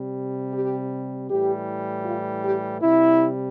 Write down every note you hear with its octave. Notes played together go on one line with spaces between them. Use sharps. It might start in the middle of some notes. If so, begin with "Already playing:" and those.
Already playing: C3 G3
G4
A2 E3 G3 G4
F4
G4
C3 G3 E4